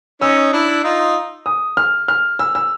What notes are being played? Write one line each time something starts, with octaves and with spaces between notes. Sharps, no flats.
C#4 D#4 E6
D4 E4
D#4 F4
D#6
F6
F6
E6
E6